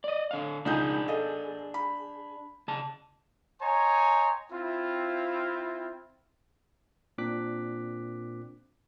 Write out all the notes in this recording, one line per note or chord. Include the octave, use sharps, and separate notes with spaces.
D5 D#5
D3 F5
C#2 D4 D#4 G#4 G6
A4 D#5
B5
C#3 A5
C#5 D#5 G5 G#5 A#5 C6
C4 E4 F4
A#2 C4 D4 D6 F#6 B6